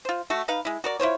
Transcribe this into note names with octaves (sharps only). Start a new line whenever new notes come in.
F4 C5
A3 F#4
D#4 B4 F5
G#3 E4
F#4 A#4 D5
E4 F4 C5 C#5